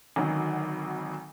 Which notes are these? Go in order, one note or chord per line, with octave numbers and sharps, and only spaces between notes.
G#1 D2 D#3 F#3